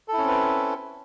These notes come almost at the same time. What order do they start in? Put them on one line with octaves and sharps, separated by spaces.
A4 E4 C#4 C4 B4